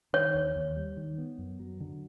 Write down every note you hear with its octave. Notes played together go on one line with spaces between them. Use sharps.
D#3 C#5
D#2
D#2
G3
D#3
B3
F#2
F#3
D3